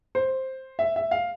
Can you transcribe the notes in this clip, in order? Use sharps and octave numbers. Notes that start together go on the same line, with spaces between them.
C5
E5
E5
F5